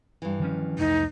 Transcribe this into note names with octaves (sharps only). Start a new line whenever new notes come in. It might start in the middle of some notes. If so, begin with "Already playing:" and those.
G2 E3
D#3 F3 C#4
C2 F2 A3 D#4